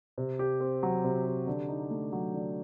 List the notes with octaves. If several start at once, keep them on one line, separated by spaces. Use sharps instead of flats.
C3
G4
C4
F#3
C3
G4
D3
D#4
A3
F#3
D3